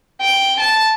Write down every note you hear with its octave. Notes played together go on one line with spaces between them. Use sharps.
G5
A5